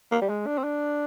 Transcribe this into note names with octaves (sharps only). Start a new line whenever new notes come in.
A#3
G3
G#3
D4
C4
D4